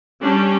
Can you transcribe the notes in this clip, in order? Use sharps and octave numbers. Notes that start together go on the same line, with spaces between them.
G3 C#4 D4